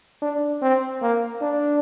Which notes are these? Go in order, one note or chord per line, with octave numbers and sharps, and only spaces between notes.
D4
C4
A#3
D4